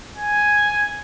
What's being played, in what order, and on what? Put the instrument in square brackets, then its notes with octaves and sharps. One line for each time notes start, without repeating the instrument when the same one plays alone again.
[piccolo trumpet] G#5